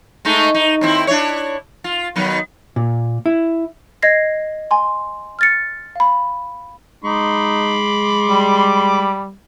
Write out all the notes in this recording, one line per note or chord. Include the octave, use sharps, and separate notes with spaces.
G#3 A3 D#4
D#4
D#2 C4 E4
D4 E4 C#5
F4
D#3 F#3 B3
A#2
E4
D#5 G#6 A#6 C7
G#5 C6
F6 A6 C#7
F5 B5
G#3 D#4 B5 C6 D6
G3